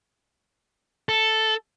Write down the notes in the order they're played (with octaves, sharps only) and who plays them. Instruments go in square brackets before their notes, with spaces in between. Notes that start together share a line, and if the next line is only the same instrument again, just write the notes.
[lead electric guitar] A4